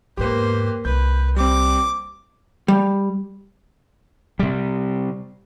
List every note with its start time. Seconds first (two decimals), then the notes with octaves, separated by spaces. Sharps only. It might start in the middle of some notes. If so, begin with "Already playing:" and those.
0.17 E2 G#2 A#3 G4 B4 C5
0.85 C2 B4 G6
1.36 G3 C4 D6
2.68 G3
4.39 C3 G3